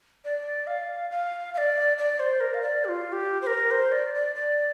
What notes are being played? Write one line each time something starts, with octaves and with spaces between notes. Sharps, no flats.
D5
F5
F5
F5
D5
D5
C5
A#4
F5
D5
G4
F4
G4
C5
A#4
C5
D5
D5
D5